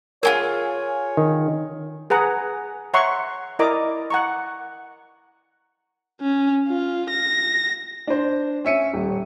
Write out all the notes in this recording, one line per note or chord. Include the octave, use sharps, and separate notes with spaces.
F4 G4 G#4 A#4 C#5 G#5
D#3
G#4 B4 F#5 A#5
C#5 E5 F#5 A#5 C6 C#6
E4 A#4 D5 D#5 A#5 D6
F#5 A#5 C#6
C#4
F4
A#6
D4 C5
C#4 E5 C#7 D#7
D#1